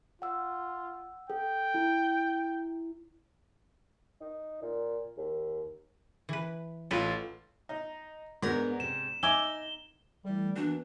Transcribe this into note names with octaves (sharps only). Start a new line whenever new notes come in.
F4 F#5 E6
A4 G5
E4
D#4
A#2
D#2
E3 B4
A1 F4 A4 B4
D#4
G#2 B3 D4 A#4
C3 E7
D#4 E5 G#5 D6 G7
E3 G3 A3
E3 A#3 B3 D4 F#4